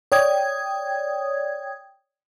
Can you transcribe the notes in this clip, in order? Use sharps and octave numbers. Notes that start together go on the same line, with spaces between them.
C#5 D5 G5 D#6 G#6